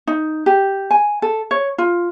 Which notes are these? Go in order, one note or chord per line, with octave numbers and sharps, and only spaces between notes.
D#4
G4
G#5
A4
C#5
F4